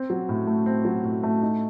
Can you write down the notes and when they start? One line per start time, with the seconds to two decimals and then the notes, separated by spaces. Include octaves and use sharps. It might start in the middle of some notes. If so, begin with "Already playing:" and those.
Already playing: C4
0.10 F#3
0.29 A2
0.47 A3
0.66 C4
0.85 F#3
1.04 A2
1.23 A3
1.42 D#4